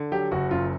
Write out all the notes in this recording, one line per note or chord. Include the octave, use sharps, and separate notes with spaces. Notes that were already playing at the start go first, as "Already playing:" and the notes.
Already playing: D3
F#3 G4
F#1 F#4
F#2 F4